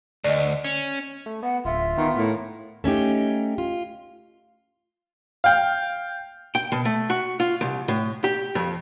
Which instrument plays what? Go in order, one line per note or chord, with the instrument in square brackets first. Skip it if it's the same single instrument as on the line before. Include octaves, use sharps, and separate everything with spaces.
[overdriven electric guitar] D2 [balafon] D5 D#5
[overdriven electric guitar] C#4
[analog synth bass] A3
[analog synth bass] B3 [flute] F#5
[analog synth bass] D1 [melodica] F4 [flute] E5
[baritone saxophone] D#3 [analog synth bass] B3
[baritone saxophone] A2 [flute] A#4
[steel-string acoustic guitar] A3 C#4 D#4 G4
F4
[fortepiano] F5 G5
[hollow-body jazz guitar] G5
B2
A3
F#4
F4
C2
A2
G4
F2